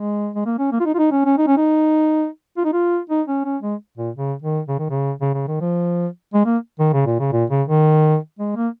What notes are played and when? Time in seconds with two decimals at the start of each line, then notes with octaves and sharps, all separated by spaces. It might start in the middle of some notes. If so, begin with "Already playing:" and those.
Already playing: G#3
0.35 G#3
0.46 A#3
0.59 C#4
0.72 A#3
0.80 F4
0.86 D#4
0.94 F4
0.98 D#4
1.12 C#4
1.25 C#4
1.38 D#4
1.47 C#4
1.57 D#4
2.57 F4
2.65 D#4
2.73 F4
3.10 D#4
3.28 C#4
3.45 C#4
3.62 G#3
3.97 A#2
4.15 C#3
4.42 D#3
4.68 C#3
4.79 D#3
4.90 C#3
5.21 C#3
5.34 C#3
5.48 D#3
5.61 F3
6.34 G#3
6.45 A#3
6.79 D#3
6.93 C#3
7.06 A#2
7.20 C#3
7.32 A#2
7.50 C#3
7.68 D#3
8.39 G#3
8.56 A#3